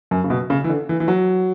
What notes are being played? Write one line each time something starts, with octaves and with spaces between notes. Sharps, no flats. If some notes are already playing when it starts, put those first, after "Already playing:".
F#2
C#3
B2
C#3
E3
D3
E3
E3
F#3